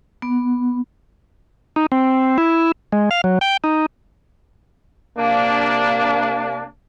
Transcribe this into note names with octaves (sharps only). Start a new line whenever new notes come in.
B3
D#4
C4
E4
G#3
F5
F#3
G5
D#4
C3 A#3 D4